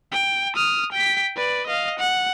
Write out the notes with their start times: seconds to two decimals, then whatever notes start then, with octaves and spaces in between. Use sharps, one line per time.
0.12 G5
0.55 D#6 F6
0.93 G5 B6
1.36 B4 D5
1.67 D#5 F5
2.00 F#5